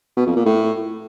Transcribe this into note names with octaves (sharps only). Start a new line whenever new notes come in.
B2
F2
A#2
A2